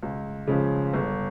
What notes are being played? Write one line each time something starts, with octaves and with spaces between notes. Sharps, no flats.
C#2
C#3 F3 G#3
G1